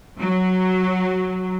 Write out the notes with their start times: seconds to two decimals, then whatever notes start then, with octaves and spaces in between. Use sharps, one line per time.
0.19 F#3